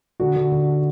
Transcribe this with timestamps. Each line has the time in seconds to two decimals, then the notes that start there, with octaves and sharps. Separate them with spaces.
0.20 D3 F#4
0.35 D3
0.52 D3